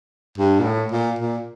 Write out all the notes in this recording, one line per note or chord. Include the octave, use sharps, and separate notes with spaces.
G2
A#2
A2
A#2
A#2